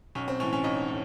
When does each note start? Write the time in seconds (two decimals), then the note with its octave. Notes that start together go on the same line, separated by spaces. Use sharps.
0.15 B1 C#4
0.28 C4
0.40 A2 E3 C#4
0.53 C#4
0.64 B1 D#4
0.88 A2